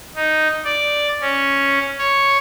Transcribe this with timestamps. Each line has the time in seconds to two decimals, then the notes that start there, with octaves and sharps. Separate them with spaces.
0.15 D#4
0.64 D5
1.21 C#4
1.98 C#5